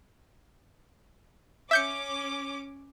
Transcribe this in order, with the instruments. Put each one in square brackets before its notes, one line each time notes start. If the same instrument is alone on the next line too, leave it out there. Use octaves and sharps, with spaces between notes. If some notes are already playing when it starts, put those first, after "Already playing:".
[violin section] C#4 D6 [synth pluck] E5 G6 C#7